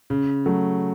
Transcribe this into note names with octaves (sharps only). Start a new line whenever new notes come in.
C#3
F#3 A3